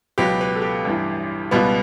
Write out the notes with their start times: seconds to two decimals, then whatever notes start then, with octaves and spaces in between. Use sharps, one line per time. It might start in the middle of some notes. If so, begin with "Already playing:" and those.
0.18 C#2 B2 F#3 B3 G4
0.41 B4
0.55 A4
0.62 G4
0.85 A1 G2 E3
1.51 C#2 B2 G3 B3